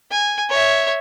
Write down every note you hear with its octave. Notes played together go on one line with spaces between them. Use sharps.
G#5
C#5 E5